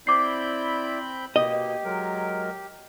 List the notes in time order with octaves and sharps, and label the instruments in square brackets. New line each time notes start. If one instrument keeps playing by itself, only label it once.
[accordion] C4 B5 G6 [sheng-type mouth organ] E4 D5 [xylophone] D6 C7
[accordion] B2 A#3 [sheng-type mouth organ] G4 [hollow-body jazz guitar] D#5
[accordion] F#3 G#3 A#4